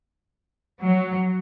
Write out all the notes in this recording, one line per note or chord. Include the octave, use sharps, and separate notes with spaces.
F#3